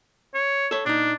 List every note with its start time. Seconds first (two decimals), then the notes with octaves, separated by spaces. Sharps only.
0.35 C#5
0.71 A4 C#5
0.86 A#2 D4 D#4